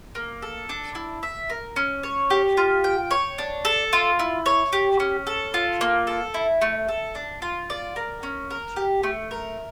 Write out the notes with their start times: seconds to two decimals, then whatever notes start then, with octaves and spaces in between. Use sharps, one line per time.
0.15 A#3
0.42 A4
0.69 D4
0.95 E4
1.23 E5
1.50 A#4
1.76 C#4
2.03 C#5
2.30 G4
2.57 F4
2.84 G5
3.11 C#5
3.38 D4
3.65 A4
3.93 F4
4.19 E4
4.46 C#5
4.73 G4
5.00 C#4
5.27 A4
5.54 F4
5.81 A#3
6.07 A4
6.34 E4
6.62 A3
6.89 A4
7.15 D4
7.42 F4
7.70 D5
7.96 A#4
8.23 C#4
8.51 A#4
8.76 G4
9.03 A3
9.31 A#4